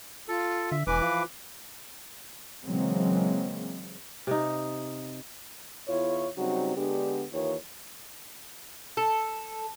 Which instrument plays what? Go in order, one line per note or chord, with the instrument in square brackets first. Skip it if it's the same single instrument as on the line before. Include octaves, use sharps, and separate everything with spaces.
[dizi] F4 [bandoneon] A4
[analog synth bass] D3 [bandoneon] E5
[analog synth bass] E1 [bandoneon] E3 B4 D6 [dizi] G#5
[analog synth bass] F3 [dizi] F5
[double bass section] C#3 E3 F#3 G#3 A#3 C4
[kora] C3 D#4
[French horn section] E2 E4 F4 C#5
C#3 F#3 G3 C4 D#4 F#4
D3 G#3 B3 D4 G4
D#2 D#3 E3 F4 C#5
[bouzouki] A4